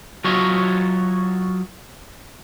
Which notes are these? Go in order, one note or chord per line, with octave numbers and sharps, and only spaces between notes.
F#3 F4 F#4 C#5 D#5 E5